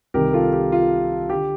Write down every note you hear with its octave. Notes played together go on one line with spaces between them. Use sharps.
C2 C3 D#3 G4 A#4
F4 A4
G4
F4
D3 G4